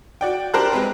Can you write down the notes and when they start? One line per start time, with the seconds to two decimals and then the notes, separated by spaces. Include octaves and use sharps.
0.21 F#4 D5 G5
0.54 D4 G4 A#4 C5 A5 F#6
0.72 G#3 C4 B4 A#5